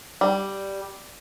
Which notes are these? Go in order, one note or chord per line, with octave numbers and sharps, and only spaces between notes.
G3